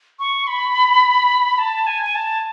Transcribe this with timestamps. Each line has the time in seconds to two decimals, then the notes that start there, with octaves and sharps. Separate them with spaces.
0.19 C#6
0.47 B5
1.58 A5
1.87 G#5
2.03 G#5
2.15 A5